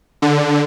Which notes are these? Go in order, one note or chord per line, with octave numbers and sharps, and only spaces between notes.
D3